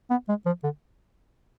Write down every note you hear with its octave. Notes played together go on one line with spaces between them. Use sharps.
B3
G#3
F3
D3